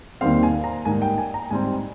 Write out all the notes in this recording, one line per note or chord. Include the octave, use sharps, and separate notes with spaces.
D#2 D#3 G3 C4 F5
G#5
A#5
G#2 G3 A#3 G#5
G5
G#5
A#5
G#2 G3 C4 G#5